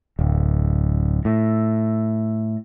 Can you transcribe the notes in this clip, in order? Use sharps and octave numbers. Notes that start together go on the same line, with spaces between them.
D1
A2